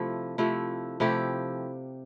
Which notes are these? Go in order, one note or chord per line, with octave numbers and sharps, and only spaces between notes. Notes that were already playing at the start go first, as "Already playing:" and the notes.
Already playing: C3 F3 A3 E4
C3 F3 A3 E4
C3 F3 A3 E4 G4